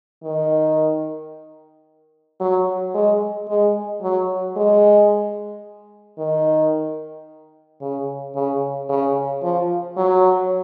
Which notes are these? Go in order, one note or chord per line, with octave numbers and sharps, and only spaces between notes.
D#3
F#3
G#3
G#3
F#3
G#3
D#3
C#3
C#3
C#3
F3
F#3